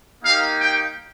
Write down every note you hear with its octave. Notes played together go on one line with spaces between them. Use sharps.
A#3 D#4 G4 F5
G5